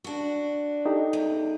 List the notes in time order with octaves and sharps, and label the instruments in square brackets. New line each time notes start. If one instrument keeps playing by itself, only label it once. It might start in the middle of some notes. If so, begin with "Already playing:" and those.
[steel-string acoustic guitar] D4 F#4
[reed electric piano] D#4 G4 A4
[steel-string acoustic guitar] E2